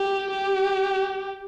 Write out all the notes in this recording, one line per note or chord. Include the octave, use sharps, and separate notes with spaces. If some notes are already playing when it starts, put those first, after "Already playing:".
Already playing: G4
G4